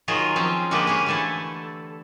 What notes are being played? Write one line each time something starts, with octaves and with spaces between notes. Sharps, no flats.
D#3 F#3 F4 G#4 A#4
F3 C4 C#4 F5
D3 F3 G#3 A#3 G4 B4
C#4 G4 G#4
D3 E3 A3 E4 A4